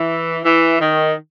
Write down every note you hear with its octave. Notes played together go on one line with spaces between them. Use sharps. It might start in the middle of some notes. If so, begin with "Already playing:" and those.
Already playing: E3
E3
D#3